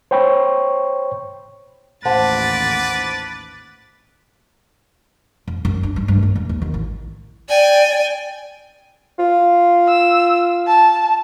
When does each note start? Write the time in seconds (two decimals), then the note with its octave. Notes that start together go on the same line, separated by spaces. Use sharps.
0.11 C5 C#5 G5 B5 C#6
2.05 A1 D#2 B4 C5 F#5 A5 D6 A6
5.48 F2
5.65 F#2
5.83 D4
5.96 G2
6.08 G2
6.23 A#3
6.35 F2
6.49 D#2
6.62 D#3
6.74 A1
7.49 D5 G5 G#5
9.19 F4
9.88 E6
10.67 A5